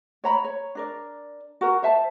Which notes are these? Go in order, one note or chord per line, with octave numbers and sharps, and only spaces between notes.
C#5 A#5 B5
C#5
D4 A#4 D5
F#4 A#4
C5 E5 A5